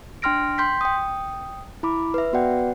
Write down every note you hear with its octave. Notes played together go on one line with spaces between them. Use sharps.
D4 G5 C6 F6 A#6 D7
G5 C6 G6 B6
G5 D#6
E4 B5 D6
B4 E5
B3 F#4 B4 D5 F#5 G5